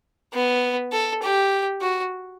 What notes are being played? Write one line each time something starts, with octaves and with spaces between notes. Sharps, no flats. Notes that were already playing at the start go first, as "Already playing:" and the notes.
B3
A4
G4
F#4